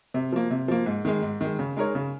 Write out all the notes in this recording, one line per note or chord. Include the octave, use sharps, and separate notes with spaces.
C3
F3 A#3
C3
F3 A#3
G#2
D#3 G#3
G#2
D#3 G#3
C#3
G#3 D#4 A#4 C#5
C#3